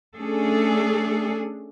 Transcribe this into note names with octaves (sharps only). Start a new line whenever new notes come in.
A3 C#4 D4 G#4 A4